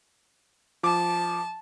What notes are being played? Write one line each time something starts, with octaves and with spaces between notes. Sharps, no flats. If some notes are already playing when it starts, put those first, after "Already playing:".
F3 A5 D6